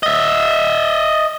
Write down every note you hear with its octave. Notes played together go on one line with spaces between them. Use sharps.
D#5 E5